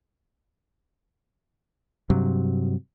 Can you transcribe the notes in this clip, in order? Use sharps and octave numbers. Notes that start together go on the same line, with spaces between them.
G2 C3 F#3